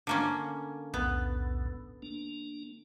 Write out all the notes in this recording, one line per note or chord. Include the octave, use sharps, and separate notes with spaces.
D3 A#3 C#4
B1 E2 A2 B3
A#3 D4